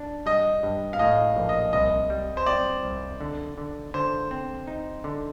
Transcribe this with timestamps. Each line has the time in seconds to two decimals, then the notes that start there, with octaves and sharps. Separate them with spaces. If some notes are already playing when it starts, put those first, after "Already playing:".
Already playing: D4
0.26 G3 D#5
0.63 G2
0.93 F5
0.99 A2 D#5
1.36 A#1
1.49 D#5
1.73 C2 D#5
2.10 G3
2.37 C5
2.46 C4 D5
2.84 C2
3.21 D3
3.58 D3
3.94 D3 C5
4.31 C4
4.67 D#4
5.04 D3